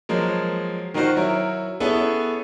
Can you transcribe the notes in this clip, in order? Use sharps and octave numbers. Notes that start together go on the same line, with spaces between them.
F3 F#3 G#3 A#3
D#3 D#4 F4 F#4 C5
F#3 E4 A#4
B3 C#4 E4 G#4 A4 C#5